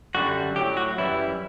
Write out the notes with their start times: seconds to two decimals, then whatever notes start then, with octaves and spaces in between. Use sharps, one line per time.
0.15 F#2 D3 G3 F#4
0.56 A2 F#3 G4
0.77 F#4
0.97 F#2 E3 G3 E4